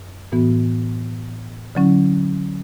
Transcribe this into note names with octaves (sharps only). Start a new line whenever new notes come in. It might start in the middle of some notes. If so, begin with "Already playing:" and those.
Already playing: F#2
A2 E3 B3 F#4
D3 F#3 C#4 E4